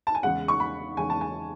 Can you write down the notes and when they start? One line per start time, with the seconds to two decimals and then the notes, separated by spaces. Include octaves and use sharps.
0.07 A5
0.15 G#5
0.23 E2 C#3 G#3 F#5
0.48 C#6
0.60 B5
0.97 E2 C#3 G#3 G#5
1.10 A5
1.21 G#5